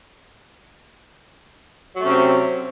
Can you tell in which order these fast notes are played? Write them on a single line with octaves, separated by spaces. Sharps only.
F#3 A3 C#4 C3 C4